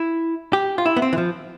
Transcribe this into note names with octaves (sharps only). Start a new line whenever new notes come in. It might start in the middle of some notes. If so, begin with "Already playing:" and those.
Already playing: E4
G4
F4
E4
B3
C4
E3
F3